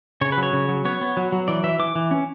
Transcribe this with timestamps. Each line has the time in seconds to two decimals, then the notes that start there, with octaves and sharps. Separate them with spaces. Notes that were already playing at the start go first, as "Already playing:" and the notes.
0.21 C#3 C#5
0.32 B4
0.37 F#3
0.43 C#5
0.53 C#3
0.69 F#3
0.85 B3 C#5
1.01 B3
1.17 F#3
1.32 F#3
1.48 E3 D5
1.64 E3 E5
1.79 E3 D6
1.96 E3
2.11 C#4